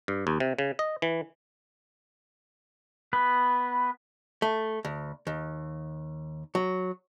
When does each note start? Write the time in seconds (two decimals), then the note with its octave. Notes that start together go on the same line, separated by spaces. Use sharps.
0.08 G2
0.27 D#2
0.40 C3
0.59 C#3
0.79 D#5
1.02 E3
3.13 B3 B4
4.42 A3
4.85 D2
5.27 D#2
6.55 F#3